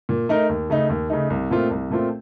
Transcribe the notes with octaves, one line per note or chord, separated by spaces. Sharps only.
A#2
A3 D#4 A#4
D#2
C#3 A3 D#4
D#2
C#3 A3 D#4
C2
A#2 A3 C4 F4
C2
A#2 A3 C4 F4